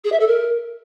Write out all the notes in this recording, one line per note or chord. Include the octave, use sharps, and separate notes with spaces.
G#4
E5
A4
A#4